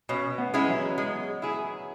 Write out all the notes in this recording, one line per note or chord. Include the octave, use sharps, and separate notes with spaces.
B2 C#4
B3
G#3 C#4 E4
F#3
G#3
E4 G#4